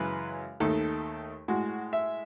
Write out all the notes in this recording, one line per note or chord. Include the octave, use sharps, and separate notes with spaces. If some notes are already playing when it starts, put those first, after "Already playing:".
Already playing: F#2 C#3 E3 G#3 B4
D#2 D#3 A3 A4
A2 G#3 F#4
E5